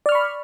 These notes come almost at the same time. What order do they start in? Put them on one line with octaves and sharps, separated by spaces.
D5 F6 C#6 B5